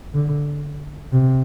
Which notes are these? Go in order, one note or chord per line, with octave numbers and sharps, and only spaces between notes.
D3
C3